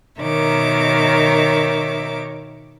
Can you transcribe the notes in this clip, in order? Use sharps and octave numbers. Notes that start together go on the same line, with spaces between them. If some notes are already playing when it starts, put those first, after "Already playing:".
B2 D#3 A#4 C#5 E5 D6